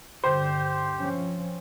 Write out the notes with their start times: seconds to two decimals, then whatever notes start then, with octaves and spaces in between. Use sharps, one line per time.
0.24 G2 D3 G4 C5
0.99 F3 C4 C#4